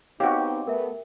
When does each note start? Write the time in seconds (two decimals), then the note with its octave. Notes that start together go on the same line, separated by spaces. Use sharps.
0.20 B3 C4 D#4 F#4 G4 C#5 F5 D6
0.67 A3 B3 A#4 E5